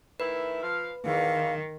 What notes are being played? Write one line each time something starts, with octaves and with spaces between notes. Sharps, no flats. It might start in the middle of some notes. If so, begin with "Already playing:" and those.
D#3 A3 E4 B4
F3 F5
E2 D#3 F5